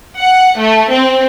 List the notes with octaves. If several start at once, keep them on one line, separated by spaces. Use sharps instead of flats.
F#5
A3
C4